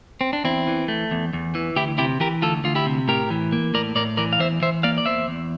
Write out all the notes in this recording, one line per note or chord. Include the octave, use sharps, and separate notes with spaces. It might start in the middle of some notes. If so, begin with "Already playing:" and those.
C4
D4
E2 C4 E4
E3
A3
E2
E2
E3
D2 E4 G4
C3 E4 G4
E3 G4 A#4
D2 F4 A4
D2 F4
E4 G4
C3
A2 G4 A#4
E3
A#3
A2 A#4 D5
A2 A#4 D5
E3 A#4 D5
F5
E2 C5 E5
E3 C5 E5
A#3 D5 F5
D5
E2 C5 E5
E2